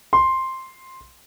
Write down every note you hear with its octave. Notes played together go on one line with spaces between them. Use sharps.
C6